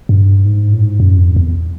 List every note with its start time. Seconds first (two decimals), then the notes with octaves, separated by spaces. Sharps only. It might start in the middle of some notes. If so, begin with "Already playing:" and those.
0.09 G2
0.45 G#2
0.73 A2
0.81 G#2
1.00 F#2
1.18 F2
1.36 E2